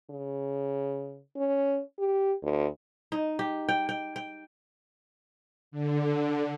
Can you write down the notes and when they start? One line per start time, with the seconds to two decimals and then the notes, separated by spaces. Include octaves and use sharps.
0.10 C#3
1.37 C#4
1.99 G4
2.43 D2
3.12 D#4
3.39 G4
3.69 G5
3.89 G5
4.16 G5
5.71 D3